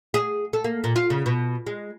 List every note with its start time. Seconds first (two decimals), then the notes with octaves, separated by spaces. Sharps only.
0.14 G#4
0.53 A4
0.64 A#3
0.84 A#2
0.96 F4
1.10 C#3
1.26 B2
1.67 G#3